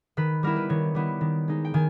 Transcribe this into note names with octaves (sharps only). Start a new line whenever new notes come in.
D#3 B4
G3 B3 E4 A#4
B4
D#3 C#5
G3 B3 E4
D#3
G#3 D#4
G5
D#3 G#5